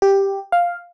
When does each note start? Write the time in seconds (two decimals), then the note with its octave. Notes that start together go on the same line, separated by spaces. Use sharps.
0.02 G4
0.52 F5